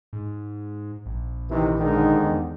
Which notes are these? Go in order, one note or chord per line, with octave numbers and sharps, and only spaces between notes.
G#2
A#1
C3 D#3 E3
G#2 D3 D#3
E2